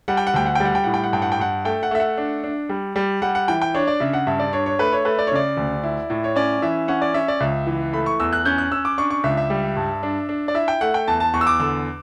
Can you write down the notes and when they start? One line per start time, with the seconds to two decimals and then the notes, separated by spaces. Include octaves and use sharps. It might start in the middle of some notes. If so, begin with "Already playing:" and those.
0.08 G3 F#5
0.17 G5
0.27 F#5
0.34 D2 G5
0.46 F#5
0.55 G5
0.60 G3 F#5
0.75 G5
0.84 A2 F#5
0.94 G5
1.03 F#5
1.13 G2 G5
1.22 F#5
1.32 G5
1.39 G2 F#5
1.65 A3 G5
1.83 F#5
1.91 A3 E5
2.00 F#5
2.18 D4
2.44 D4
2.69 G3
2.96 G3
3.22 G3 F#5
3.35 F#5
3.48 E3 G5
3.62 G5
3.75 D4 C#5
3.87 D5
4.00 C#3 E5
4.13 F#5
4.27 G2 E5
4.39 D5
4.53 D4 C#5
4.66 C#5
4.79 A3 B4
4.92 C#5
5.05 A3 B4
5.19 D5
5.27 C#5
5.32 C#3 D5
5.57 D2
5.84 E4
6.10 A2
6.24 C#5
6.36 C#4 D5
6.62 E3 E5
6.88 C#4 F#5
7.02 D5
7.14 C#4 E5
7.28 D5
7.40 C#2 E5
7.67 E3
7.93 A3 B5
8.06 C#6
8.20 E2 E6
8.33 F#6
8.45 C#4 G6
8.58 F#6
8.71 C#4 E6
8.85 D6
8.98 D4 C#6
9.11 C#6
9.24 C#2 E5
9.37 E5
9.50 G3
9.77 G2
10.03 D4
10.29 D4
10.48 D5
10.54 E4 E5
10.68 G5
10.81 A3 F#5
10.94 G5
11.08 E2 A5
11.20 A5
11.33 E2 C#6
11.41 E6
11.47 D6
11.60 D3 E6